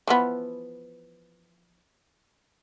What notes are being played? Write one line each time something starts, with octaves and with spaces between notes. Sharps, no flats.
E3 F3 B3